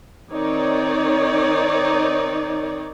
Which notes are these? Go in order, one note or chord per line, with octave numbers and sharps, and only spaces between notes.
D#3 C4 D#4 C#5 D5